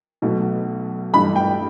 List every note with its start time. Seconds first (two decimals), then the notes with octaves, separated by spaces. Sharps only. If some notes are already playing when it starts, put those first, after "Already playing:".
0.22 B1 B2 A3
1.13 A1 G2 E3 A3 B5
1.36 G5